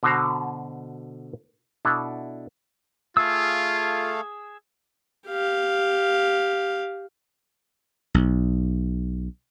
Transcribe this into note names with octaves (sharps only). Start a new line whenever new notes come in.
B2 D3 F#4 C5 A#5
B2 D4 E4 A4
A3 F4 G#4 A4 F5 E6
G4 F5
B1